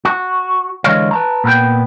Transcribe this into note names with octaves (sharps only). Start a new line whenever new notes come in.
F#4
D3 E3 G#3 C#5 D#5 F5
B4 A5 A#5
A#2 B3 A#4 G5